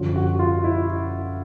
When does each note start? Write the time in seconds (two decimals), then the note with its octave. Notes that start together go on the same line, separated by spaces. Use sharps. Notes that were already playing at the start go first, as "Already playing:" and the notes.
Already playing: F#2 D3 F3
0.16 F#4
0.39 F4
0.64 E4